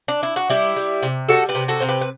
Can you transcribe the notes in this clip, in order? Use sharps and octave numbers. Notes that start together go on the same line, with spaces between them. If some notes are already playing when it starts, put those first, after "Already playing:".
D4
E4
F#4
G3 E4 G4
G3
C3
G3 F#4 A4
G4 B4
C3
F#4 A4
C3 C5
G4 B4
B4